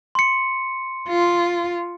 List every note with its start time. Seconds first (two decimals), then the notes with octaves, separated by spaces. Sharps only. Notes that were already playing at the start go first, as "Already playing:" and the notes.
0.15 C6 C#7
1.09 F4